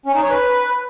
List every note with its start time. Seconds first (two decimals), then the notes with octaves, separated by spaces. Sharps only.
0.06 C#4
0.14 D#4
0.22 C#5
0.30 B4